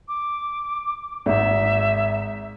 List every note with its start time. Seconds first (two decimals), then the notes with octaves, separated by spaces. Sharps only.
0.08 D6
1.26 G#1 G#2 E5